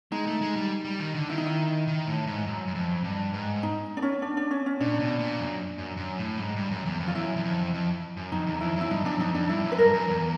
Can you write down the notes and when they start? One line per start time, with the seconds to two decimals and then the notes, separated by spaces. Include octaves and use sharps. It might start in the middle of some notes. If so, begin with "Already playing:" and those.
0.12 G#3 D#4
0.27 A3
0.41 G#3
0.56 G3
0.85 G3
0.99 D#3
1.14 D3
1.29 D#3 E4
1.38 D#4
1.46 E4
1.88 D#3
2.07 A2
2.27 G#2
2.46 F#2
2.68 F#2
2.75 F2
3.04 G2
3.34 G#2
3.63 D#4
3.97 D4
4.02 C#4
4.22 D4
4.37 D4
4.51 C#4
4.66 C#4
4.80 A#2 D4
5.00 B2
5.19 A#2
5.39 F#2
5.78 F#2
5.97 F#2
6.18 A2
6.37 G#2
6.56 G2
6.71 F#2
6.85 E2
7.00 F2
7.08 F4
7.15 F#2 E4
7.36 E2
7.44 F2
7.74 F2
8.17 F#2
8.32 F2 D#4
8.46 E2
8.61 F2 E4
8.76 F#2 E4
8.91 G2 D#4
9.05 F#2 D4
9.19 F2 D#4
9.34 F2 D4
9.49 G2 E4
9.64 F#2
9.72 B4
9.78 G2 A#4
9.93 F#2
10.07 E2